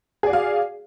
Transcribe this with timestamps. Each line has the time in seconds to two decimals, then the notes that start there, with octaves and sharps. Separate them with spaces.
0.23 G#4
0.27 D5
0.30 F#4
0.33 F5